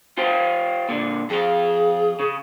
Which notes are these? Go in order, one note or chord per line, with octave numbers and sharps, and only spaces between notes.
F4 G4 C5
A#2 D3
F2 F4 G#4
C#3